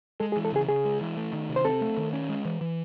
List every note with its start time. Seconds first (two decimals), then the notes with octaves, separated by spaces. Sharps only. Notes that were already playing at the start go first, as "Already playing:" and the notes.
0.20 G#3 A4
0.32 G#4
0.37 E3
0.45 A4
0.52 C#3 G#4
0.69 C#3 G#4
0.85 G#3
1.01 E3
1.17 A3
1.33 D#3
1.49 C3
1.56 C5
1.64 C4 A4
1.81 A3
1.97 D#3
2.13 C#4
2.29 G#3
2.45 E3
2.61 E3